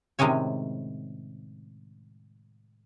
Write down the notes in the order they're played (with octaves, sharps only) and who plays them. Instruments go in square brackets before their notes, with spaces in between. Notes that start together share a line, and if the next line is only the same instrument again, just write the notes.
[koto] A2 C3 D#3 G#3 C#4 C#5